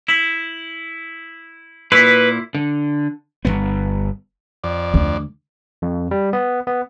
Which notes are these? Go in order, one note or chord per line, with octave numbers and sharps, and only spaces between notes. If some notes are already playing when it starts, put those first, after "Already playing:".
E4
A#2 E4 B4
D3
G1 E2 B3
F2 D5
D2 D3
F2
G3
B3
B3